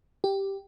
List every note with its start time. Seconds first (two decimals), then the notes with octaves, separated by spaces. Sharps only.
0.24 G4